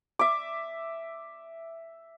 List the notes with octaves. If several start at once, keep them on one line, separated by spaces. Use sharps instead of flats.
E5 D6